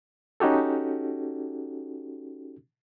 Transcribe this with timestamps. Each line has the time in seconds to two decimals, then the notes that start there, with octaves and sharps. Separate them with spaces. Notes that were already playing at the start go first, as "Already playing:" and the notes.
0.40 C#4 D#4 F#4 G4 A4